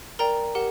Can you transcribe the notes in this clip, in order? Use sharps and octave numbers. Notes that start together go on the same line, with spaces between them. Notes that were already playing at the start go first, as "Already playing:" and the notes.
A#4 D5 G5 A#5
G4 A#4 F#5